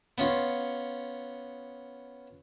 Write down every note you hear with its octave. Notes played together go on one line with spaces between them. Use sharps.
B3 C#4 F4